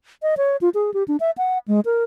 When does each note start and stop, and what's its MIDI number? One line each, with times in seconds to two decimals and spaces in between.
0.23 0.35 75
0.37 0.57 73
0.61 0.69 65
0.74 0.93 68
0.94 1.03 67
1.08 1.17 62
1.20 1.31 76
1.38 1.58 78
1.68 1.80 56
1.85 2.04 70